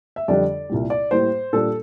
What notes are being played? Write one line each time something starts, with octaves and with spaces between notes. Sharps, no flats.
E5
F2 D3 G3 D4 D5
C2 A#2 G3
D5
A2 G3 A#3 C5
A#2 G3 D4 A4